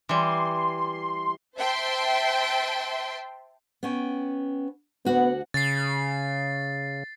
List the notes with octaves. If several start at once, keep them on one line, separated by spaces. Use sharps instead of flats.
E3 G3 C6
C5 E5 G5 A5 C6
B3 C#4 G5
D2 B3 F#4 F#5
C#3 A6 C7